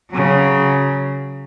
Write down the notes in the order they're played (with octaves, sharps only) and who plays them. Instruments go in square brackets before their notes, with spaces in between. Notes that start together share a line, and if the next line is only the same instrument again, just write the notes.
[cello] C#3 F#3